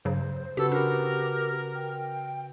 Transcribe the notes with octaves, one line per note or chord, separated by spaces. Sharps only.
G2 C#3 F#3 C5
C#3 F#4 G4 A4 B4
D4 G4 A#4
G5